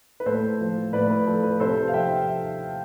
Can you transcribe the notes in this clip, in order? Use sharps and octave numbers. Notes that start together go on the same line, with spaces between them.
B4
A2 A4 C5
F3
A2 B4 D5
B4
F3 A4
B4
C3 A4 C5
F5
F3 E5 G5